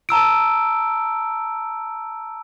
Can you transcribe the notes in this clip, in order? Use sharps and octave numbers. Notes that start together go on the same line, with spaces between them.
A5 A#5 E6 D7